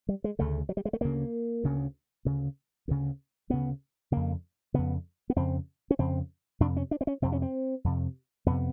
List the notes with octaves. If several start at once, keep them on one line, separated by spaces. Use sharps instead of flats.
G3
G#3
D2 C#3 A3
F#3
G3
G#3
A3
D2 C#3 A#3
D2 C#3
D2 C#3
D2 C#3
D2 C#3 B3
F2 C#3 A#3
F2 C#3 B3
B3
F2 C#3 C4
C#4
F2 C#3 C4
F2 C3 D4
C#4
D4
C4
C#4
F2 C3 C4
C#4
C4
F2 C3
F2 C3 B3